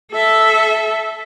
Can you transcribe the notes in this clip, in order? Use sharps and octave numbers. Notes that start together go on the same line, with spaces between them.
A4 E5